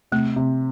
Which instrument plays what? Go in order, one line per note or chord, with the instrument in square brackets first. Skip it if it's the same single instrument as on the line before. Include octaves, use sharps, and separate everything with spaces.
[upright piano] C3 [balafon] A3
[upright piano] C3